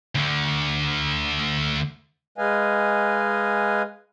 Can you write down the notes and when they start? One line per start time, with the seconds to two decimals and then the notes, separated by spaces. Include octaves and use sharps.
0.15 D2 D3
2.38 G#3 B4 D#5 F5 G#5